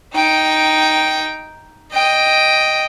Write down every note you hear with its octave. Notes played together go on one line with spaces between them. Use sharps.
D#4 G5
D#5 G5